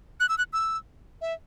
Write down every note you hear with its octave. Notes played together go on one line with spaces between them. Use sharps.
F#6
E6
F#6
E6
E5